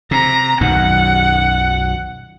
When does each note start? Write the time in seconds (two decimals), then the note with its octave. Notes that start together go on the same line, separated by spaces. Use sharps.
0.11 C3 A#5
0.61 B1 F#2 D#3 F#5